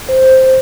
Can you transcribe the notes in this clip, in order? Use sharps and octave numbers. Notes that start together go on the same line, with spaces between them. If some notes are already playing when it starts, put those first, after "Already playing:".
C5